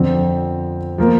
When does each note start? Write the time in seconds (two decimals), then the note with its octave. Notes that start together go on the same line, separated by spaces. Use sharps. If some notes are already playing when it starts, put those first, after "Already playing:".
Already playing: F2 D3 F3 C4
0.98 F3 A#3 F4 A#4